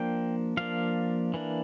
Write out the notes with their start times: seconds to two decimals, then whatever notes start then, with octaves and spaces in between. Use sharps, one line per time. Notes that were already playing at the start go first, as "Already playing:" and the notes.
Already playing: F3 A#3 D4 G5
0.57 F3 A#3 D4 F5
1.34 E3 A#3 D4